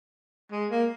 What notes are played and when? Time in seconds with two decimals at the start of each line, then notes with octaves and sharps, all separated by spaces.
0.52 G#3
0.70 A#3